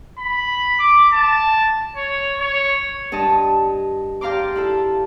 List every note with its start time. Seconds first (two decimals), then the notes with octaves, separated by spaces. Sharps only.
0.19 B5
0.80 D6
1.13 A5
1.97 C#5
2.40 C#5
3.12 G2 D#5 A5
4.21 G4 D5 F5 A#5 C6 D6
4.55 E4 F4 A4